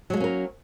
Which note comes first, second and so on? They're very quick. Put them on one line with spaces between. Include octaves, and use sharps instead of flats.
F#3 G#3 A#3 C#4 A#4